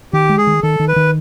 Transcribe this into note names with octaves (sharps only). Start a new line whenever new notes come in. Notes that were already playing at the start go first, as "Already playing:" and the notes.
D#3 G4
G#3
G#4
D#3
D#3 A4
D#3
B4
D#3